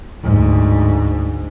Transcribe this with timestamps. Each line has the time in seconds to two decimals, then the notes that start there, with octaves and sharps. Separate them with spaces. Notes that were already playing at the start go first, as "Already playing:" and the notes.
0.24 D2 G#2